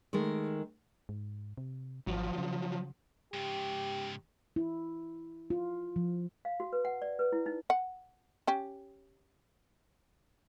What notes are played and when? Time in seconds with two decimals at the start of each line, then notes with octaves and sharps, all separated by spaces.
0.13 D#3 G#3 A3 A#4
1.09 G#2
1.58 C3
2.07 G#1 F3 F#3
2.38 C#3
3.34 G#2 C#3 G4
4.56 E4
5.50 F4
5.96 F3
6.45 F5
6.60 F#4
6.73 B4
6.85 F#5
7.02 D5
7.19 B4
7.32 E4
7.46 D#4
7.70 F#5
8.47 C#4 G4